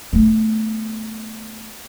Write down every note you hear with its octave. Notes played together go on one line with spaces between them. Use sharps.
A3 B3